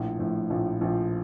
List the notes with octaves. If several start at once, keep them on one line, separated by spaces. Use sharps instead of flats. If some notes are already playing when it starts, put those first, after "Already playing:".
Already playing: A#1 A2 F3
A#1 A2 F3
A#1 A2 F3
A#1 A2 F3